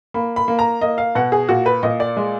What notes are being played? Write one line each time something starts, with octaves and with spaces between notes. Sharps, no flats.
A#3 B5
B5
A#3
A#5
A#3 D#5
F5
B2 F#5
G#4
A#2 F#4
B4
A#2 D#5
D5
G#3